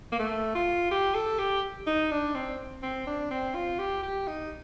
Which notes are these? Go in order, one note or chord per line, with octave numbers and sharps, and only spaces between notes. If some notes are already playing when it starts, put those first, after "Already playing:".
A#3
A3
F4
G4
A4
G4
D#4
D4
C4
C4
D4
C4
F4
G4
G4
D#4